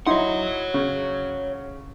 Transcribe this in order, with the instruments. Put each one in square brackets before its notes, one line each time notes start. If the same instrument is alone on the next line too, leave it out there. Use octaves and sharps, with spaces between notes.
[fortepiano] D#4 E4 C6 [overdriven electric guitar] C#5 F#5
[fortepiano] C#3